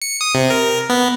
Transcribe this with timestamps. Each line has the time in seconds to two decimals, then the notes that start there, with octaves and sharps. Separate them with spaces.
0.02 C#7
0.21 D#6
0.35 C3
0.50 A#4
0.89 B3